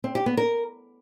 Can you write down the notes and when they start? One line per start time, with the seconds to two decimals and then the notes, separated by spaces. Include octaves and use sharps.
0.04 C4
0.15 G4
0.26 B3
0.37 A#4